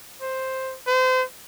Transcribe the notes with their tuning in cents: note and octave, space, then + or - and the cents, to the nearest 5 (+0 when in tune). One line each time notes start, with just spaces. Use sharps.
C5 +5
C5 -35